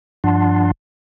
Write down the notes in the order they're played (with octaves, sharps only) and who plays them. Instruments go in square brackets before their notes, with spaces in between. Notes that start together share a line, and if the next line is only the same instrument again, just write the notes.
[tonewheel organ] G2 F3 D4 F#5 A5 C6